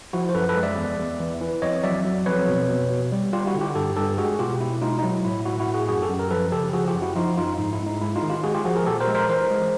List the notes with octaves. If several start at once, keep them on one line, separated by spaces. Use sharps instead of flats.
F3 E4 F#4
C5
F#2 A4 B4
A4 B4
G#3
D5 E5
E2
E2
E3
E3
F2 C#5 D#5
F#3 D5 E5
F#3
F2 B4 C#5
B2
B2
B2
G3
G3 F4 G4
E4 F#4
D3
F4 G4
G2 G4 A4
G2 G4 A4
G#3 F#4 G#4
B2 F4 G4
B2 E4
G#3 D#4 F4
D#4
F#3 E4
A2 E4
A2 E4 F#4
E4 F#4
A2
F#4 G#4
F#2 F#4 G#4
G4 A4
F#2
A#4
F3 A4 B4
C#3 G4 A4
F3 F#4 G#4
F4 G4
F#2
E4 F#4
F3 D#4 F4
F#2 D#4 F4
G#2 D#4
E4
G#2
D#4
G#3 E4
D#4 F4
D#3
F4 G4
G#3 F#4 G#4
F4 G4
F3 F#4 G#4
G#4 A#4
A#2 G4 A4
A#4 C5
G#3
A#4 C5
E3 A#4 C5
G#3